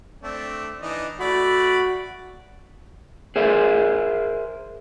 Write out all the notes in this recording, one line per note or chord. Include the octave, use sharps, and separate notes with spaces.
A3 C4 D4
E3 D4 D#4
A3 F#4 D5 B5
G#4 A#4 C5 E5